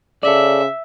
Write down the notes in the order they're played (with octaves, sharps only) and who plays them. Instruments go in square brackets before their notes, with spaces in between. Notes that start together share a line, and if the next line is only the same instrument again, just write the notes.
[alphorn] C#3 [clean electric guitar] A4 D5 [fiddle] E5